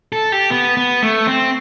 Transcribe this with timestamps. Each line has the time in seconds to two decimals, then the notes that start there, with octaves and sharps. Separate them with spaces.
0.12 A4
0.32 G4
0.51 B3
0.77 B3
1.02 A3
1.27 C4